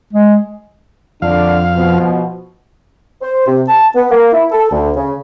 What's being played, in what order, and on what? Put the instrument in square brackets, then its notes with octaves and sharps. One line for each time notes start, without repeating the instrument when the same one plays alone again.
[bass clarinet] G#3
[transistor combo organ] F2 F5 [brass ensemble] D3 D4
[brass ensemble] B2 F3
[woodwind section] C5
C3
A5
B3
A#3
E4
A4
D2
C#3